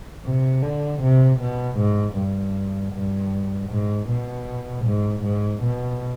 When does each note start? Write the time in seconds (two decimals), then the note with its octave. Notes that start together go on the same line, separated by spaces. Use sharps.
0.25 C3
0.62 D3
1.01 C3
1.40 B2
1.77 G#2
2.17 G2
2.93 G2
3.70 G#2
4.09 B2
4.85 G#2
5.23 G#2
5.63 B2